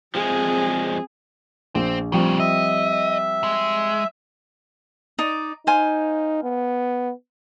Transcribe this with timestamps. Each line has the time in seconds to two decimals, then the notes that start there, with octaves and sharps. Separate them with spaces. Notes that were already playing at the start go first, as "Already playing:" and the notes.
0.15 F3 G#3 C4 G#4
1.75 A#1 C4
2.12 A#2 C#3 F3 G3 C4
2.40 D#5 E5
3.44 G#3
5.19 D#4 D5
5.67 D#4 C5 F5 G#5
6.43 B3